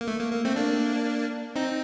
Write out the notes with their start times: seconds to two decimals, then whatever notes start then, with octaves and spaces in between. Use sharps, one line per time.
0.01 A#3
0.07 A3
0.20 A#3
0.32 A#3
0.45 A3 C4
0.56 A#3 D4
1.56 C4 D#4